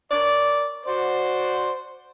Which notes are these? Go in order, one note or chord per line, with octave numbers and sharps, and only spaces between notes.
A#4 C#5 D5
F#4 C5 D5